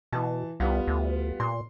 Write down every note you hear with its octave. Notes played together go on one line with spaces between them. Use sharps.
B2 E3 A5
C2 G3 B3 F4
D2
A#2 C6